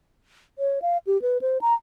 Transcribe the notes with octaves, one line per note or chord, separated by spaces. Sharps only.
C#5
F5
G4
B4
C5
A#5